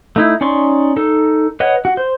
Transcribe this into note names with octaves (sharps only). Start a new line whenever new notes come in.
A3 D#4 E4
C#4 D#4 D5 C6 C#6
D#4 A4
B4 C#5 D#5 F#5
F#4
C5